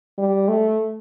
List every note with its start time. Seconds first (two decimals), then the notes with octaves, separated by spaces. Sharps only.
0.18 G3
0.48 A3